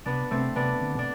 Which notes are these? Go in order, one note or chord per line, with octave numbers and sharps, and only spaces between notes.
C3 B3 D4
C3 A3 C4
C3 B3 D4
D3
B2 D4